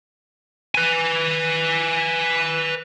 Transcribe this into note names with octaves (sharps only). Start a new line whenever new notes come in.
B4 G#5